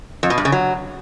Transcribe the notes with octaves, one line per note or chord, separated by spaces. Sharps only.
F2
B2
G2
C#3
F#3